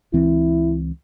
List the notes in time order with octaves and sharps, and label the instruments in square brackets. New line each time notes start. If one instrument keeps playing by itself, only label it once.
[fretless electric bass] C#2 E3 C4 [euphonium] E4